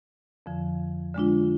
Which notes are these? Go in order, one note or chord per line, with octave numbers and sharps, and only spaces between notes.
F2 D3 F3
D3 G#3 D4 F4